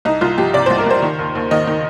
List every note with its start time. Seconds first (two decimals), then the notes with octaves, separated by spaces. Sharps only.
0.05 C2 D#4
0.21 C2 F4
0.38 F3 G4
0.53 C3 D5
0.66 C2 C5
0.78 A#4
0.86 C2 C5
1.02 D#3
1.19 D#2
1.35 D#2
1.51 D#3 D#5
1.67 D#3